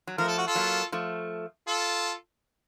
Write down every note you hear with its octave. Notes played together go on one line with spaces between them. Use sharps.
F#3
F3 A3 A#4
A4
F#4
F4 A4
F#3 A#3
F3 A3
F4 A4